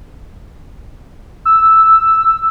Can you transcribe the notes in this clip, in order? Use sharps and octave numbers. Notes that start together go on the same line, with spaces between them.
E6